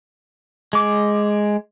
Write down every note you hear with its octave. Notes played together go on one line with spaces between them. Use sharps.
G#3 D6